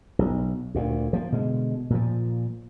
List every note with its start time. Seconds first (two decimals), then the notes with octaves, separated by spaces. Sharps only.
0.19 B1
0.75 D2 A#2
1.13 F3 A#3
1.32 B2 D3 G#3
1.90 A#2 F3